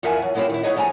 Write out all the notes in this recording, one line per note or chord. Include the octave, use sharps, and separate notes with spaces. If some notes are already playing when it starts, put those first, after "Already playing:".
E2 F3 A#4 E5 F#5 G#5
F#3
F#3 G#3 C4 E4 F4 G4
D#3 E4
F#3 B3 D#4 G#4 C#5 D#5
F3 A3 G#5 A#5